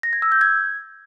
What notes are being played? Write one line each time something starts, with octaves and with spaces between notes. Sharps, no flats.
A#6
G#6
E6
G6
G#6